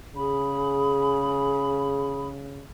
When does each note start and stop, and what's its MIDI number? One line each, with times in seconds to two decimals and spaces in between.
0.16 2.68 49
0.16 2.29 68
0.16 2.28 83